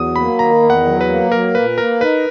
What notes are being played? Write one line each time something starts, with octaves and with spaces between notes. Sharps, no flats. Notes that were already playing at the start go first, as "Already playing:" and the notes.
Already playing: E2 F#3 D#6
A#3 B5
D#3 A#5
E2
F#5
F#3
B4
A#3
F#3 A#4
A#2 B4
A#3 A#4
D#4 B4